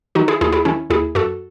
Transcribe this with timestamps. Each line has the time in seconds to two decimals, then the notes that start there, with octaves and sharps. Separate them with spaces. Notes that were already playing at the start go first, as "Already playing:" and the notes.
0.15 D#3 D#4 F#4
0.28 E4 G#4
0.41 D#2 E4 G#4
0.52 E4 G#4
0.65 D#3 C#4 E4
0.90 D#2 E4 G#4
1.15 F#2 F#4 A4